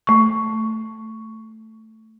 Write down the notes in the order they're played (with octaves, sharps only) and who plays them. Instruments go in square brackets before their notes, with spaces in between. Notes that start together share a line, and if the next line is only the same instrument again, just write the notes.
[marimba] A3 C#6